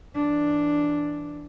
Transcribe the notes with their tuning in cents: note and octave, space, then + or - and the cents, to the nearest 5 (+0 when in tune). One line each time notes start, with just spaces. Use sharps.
E3 +0 D4 +0